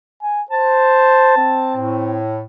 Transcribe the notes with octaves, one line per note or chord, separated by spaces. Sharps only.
G#5
C5 A5
C4
A2